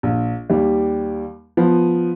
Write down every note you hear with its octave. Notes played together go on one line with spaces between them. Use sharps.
A#1
D#2 G3
F3 B3